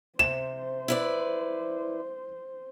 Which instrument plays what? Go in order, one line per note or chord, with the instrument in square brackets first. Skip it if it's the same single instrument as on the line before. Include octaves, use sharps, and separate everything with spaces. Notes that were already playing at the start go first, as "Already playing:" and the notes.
[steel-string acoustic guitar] C3 [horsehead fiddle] C5 [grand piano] E7
[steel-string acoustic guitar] E4 B4 D5